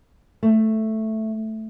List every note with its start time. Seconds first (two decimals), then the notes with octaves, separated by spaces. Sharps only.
0.43 A3